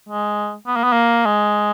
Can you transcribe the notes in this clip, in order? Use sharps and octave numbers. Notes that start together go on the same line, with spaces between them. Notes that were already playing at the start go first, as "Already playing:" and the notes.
G#3
B3
A#3
B3
A#3
G#3